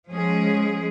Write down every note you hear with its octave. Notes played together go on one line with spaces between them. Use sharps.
F3 G#3 C#4 G#4